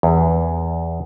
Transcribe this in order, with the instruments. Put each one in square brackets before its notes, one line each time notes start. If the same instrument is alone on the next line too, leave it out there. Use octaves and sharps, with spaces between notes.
[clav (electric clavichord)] E2